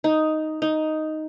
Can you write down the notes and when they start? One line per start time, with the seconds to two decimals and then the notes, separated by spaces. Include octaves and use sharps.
0.04 D#4
0.62 D#4